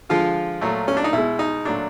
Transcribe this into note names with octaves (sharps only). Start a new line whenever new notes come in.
D3 F3 G#3 F4
A#2 F#3 A3
C#4
D4
D#4
B2 G#3 E4
D#4
A#2 F#3 A3 D4